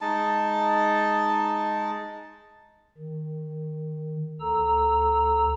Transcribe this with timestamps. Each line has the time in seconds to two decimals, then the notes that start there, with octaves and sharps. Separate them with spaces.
0.01 G#3 D#4 A5
2.97 D#3
4.40 D2 A4 A#5 E6